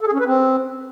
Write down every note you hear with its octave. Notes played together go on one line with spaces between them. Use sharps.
A4
G#4
C#4
B4
C4